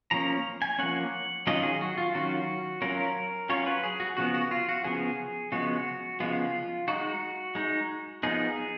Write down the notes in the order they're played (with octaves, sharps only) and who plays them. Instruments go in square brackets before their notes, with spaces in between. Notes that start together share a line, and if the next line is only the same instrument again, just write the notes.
[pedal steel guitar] F3 A#3 C#4 A#5
G#5
F3 A#3 C#4 F#5
D#3 F#3 C#4 F4 D#5
G#4
F#4
F4
D#3 F#3 C#4 F4 F#4
F#3 C#4 F4 A#4
F#3 C#4 F4 C#5
B4
G#4
F#4
C#3 F3 B3 F#4
F#4
F4
F#4
C#3 F3 B3 G#4
C#3 F3 G#3 B3 F#4
C#3 F3 G#3 B3 F4
G#3 D#4 F#4
G#3 D#4
F3 B3 D#4 G#4